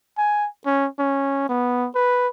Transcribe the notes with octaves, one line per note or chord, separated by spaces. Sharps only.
G#5
C#4
C#4
B3
B4